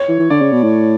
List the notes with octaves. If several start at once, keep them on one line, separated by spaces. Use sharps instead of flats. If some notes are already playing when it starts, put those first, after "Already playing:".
Already playing: C#5
E3
E3
D3 D5
C#3
B2
A2